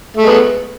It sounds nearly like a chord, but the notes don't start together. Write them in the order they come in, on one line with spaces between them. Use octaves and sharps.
A3 G#3 B3